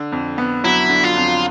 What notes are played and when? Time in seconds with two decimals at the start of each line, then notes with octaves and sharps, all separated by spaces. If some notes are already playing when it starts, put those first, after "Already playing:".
Already playing: D3
0.12 F2
0.38 B3
0.64 F#3 E4
0.90 D3
1.04 F4
1.17 F2